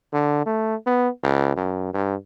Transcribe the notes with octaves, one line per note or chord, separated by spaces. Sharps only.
D3
A3
B3
C#2
F#2
G2